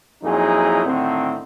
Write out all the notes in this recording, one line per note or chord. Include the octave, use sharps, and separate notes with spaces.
F2 A#2 F#3 D#4 E4 G#4
A2 D3 D#3 C4